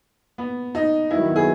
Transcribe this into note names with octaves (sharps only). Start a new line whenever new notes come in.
B3
D#4
D#3 F#3 B3 E4
G#4